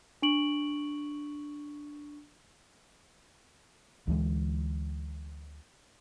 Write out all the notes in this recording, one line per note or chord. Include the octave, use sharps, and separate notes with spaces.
D4 C#6 D7 F#7
D2 E3 G#3